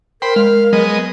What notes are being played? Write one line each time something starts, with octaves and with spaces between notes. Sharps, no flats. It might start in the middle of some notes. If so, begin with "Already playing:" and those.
A#4 C5 G5 B5
G#3 F5
F#3 G#3 B3 D#5